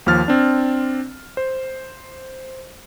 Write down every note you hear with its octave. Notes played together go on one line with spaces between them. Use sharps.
D#2 F3 F6 A6
C4 D4
C5